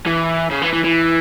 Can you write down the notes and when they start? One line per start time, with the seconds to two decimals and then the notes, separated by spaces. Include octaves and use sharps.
0.07 E3
0.51 C#3
0.62 E3
0.73 E3
0.84 E3